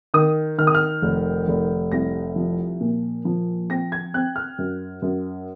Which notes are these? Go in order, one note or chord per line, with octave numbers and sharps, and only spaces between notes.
D#3 D#6
D#3 F6
D#6
F6
F1
F1
C2 A#6
F3
A#2
F3
C4 A#6
G#6
C4 F#6
F6
F#2
F#2